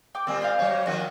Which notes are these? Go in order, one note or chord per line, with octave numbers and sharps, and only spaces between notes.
G5 D6
A#2 G3 A#3 C4
C5 F5
F#3 C#5
D#3 F3 A#3 F#4 F#5